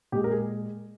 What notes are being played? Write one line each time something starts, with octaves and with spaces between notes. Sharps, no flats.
A#2 G#3 G4
A#4
G#4